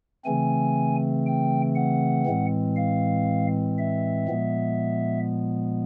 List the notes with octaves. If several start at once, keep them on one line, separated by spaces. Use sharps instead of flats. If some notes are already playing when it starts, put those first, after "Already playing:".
C#3 E3 A3 C4 G#5
G5
F#5
A2 E3 G#3 C4
F5
E5
A#2 F3 G#3 B3